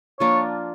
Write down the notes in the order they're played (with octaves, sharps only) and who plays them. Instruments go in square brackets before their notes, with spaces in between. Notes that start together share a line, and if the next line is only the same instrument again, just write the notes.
[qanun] F3 A#3 D4 F4 [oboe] C#5